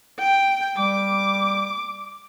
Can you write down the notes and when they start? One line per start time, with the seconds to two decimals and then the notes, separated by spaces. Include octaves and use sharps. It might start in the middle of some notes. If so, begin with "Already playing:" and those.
0.19 G5
0.78 G3 D6